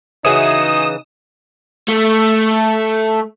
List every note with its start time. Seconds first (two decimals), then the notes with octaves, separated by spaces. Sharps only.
0.24 C#3 E3 D#4 F#4 G#4 C#5 D#6 E7
1.88 A3